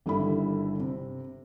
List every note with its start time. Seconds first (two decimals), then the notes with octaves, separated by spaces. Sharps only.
0.06 G1 G2 D3 D#3 E4 B5
0.79 C3